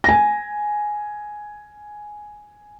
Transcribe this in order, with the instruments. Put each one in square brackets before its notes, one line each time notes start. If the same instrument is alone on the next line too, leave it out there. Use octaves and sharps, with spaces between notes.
[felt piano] G#5 A#6